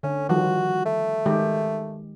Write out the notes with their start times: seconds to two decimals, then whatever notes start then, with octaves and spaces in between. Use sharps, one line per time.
0.03 D3 C#4
0.29 D#3 F3 G3 F#4
0.85 A3
1.26 D#3 G#3 G4